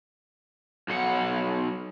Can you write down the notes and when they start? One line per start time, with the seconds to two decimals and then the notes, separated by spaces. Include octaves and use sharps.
0.88 B1 F#5